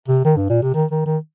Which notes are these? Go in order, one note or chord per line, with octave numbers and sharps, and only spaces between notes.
C3
D#3
G2
A#2
C3
D#3
D#3
D#3